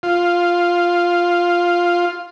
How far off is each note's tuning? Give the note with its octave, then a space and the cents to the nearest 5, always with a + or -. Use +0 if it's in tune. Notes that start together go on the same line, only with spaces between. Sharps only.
F4 +0